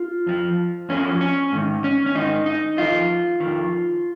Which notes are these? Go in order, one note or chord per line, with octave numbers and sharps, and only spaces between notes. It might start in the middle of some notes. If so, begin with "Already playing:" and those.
Already playing: F4
F2 F3
F2 F3 C#4
C#4
G#2 D#3
C#4
C#4
G#2 D#3 D#4
D#4
F2 D#3 F4
F2 D#3